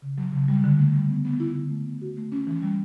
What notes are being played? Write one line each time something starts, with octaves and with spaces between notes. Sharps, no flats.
C#3
F#3
C#3
G3
D3
A3
G3
B3
B3
E4
D3
A3
B3
F#4
A3
C#4
E3
G3